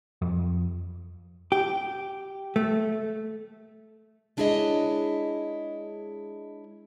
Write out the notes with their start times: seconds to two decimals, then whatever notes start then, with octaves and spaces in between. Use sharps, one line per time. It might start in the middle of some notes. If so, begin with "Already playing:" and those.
0.22 F2
1.52 G4
2.56 A3
4.37 G#3 D4 E4 G#4 C#5 D#5